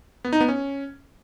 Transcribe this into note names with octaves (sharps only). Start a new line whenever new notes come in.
B3
D#4
B3
C#4